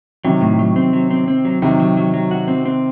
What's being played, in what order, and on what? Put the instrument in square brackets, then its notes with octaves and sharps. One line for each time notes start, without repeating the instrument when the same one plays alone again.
[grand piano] C3 D#3 [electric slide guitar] F#3
[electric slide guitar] A2
F#3
C4
F#3
C4
C4
F#3
[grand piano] C3 D#3 [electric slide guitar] F#3
[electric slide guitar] F#3
F#3
F#3
F#4
C4
C4